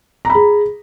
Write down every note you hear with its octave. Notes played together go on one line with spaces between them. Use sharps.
G#4 A#5 B5